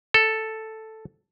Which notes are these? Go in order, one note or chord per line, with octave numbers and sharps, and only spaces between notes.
A4